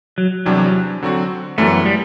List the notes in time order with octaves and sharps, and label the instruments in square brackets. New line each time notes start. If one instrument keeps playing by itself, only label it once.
[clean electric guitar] F#3
[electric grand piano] E2 C3 G3 D4 [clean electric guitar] F#3
[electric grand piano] D3 F#3 C4 F#4
[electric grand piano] F#2 E3 G3 B3 [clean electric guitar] A3
[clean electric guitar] G3